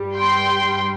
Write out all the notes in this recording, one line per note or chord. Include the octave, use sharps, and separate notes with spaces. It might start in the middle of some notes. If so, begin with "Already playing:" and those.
Already playing: G2 G3
G5 C6